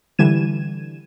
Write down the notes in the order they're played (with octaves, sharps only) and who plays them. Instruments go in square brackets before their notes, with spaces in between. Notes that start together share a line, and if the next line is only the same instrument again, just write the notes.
[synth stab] D3 E3 G3 G#6 D#7 E7